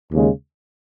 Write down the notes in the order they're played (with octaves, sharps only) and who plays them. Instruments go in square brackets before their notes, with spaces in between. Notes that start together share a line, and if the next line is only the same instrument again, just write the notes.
[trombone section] D#2 C#3 G#3